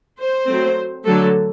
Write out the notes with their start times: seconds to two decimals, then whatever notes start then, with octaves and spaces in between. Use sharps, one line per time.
0.19 C5
0.47 F#3 A3 C4
1.05 D3 F#3 A3 A4